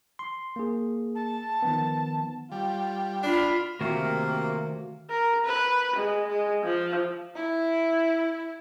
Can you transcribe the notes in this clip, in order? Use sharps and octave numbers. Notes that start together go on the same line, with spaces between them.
C6
A#3 G#4
A5
D#3 F3 B3
G3 F4
D4 F4 B5 F6
C3 D#3 A3 A#3 F#4
A#4
B4
G#3
G#3
F3
E4